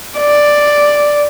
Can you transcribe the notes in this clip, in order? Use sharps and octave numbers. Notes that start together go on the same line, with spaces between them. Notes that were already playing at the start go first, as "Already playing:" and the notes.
D5